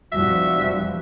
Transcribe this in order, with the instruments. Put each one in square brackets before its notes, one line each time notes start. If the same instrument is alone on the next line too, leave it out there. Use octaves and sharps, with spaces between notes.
[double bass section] F1 F3 G3 [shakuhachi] F#4 [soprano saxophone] E5